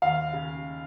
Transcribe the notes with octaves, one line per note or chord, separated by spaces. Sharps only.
D#2 F5
C#3